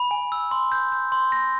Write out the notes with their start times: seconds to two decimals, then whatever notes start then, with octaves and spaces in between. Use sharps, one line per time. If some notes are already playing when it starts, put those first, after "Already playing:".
Already playing: B5
0.11 G#5
0.32 E6
0.51 C6
0.72 G6
0.92 G6
1.12 C6
1.32 A#6